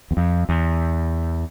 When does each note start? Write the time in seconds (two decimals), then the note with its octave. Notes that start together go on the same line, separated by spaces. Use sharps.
0.11 E2
0.17 F2
0.49 E2